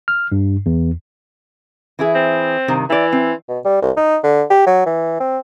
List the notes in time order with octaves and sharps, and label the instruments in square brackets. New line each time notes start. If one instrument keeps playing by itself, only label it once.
[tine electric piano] F6
G2
E2
[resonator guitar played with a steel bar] E3 E4 G#4
[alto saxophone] C4
[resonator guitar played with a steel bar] G2 C3 D#3
[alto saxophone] E3 [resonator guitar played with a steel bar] D5 E5
[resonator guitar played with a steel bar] C4
[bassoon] B2
G3
C2
D#4
D3
G4
F#3
E3
C4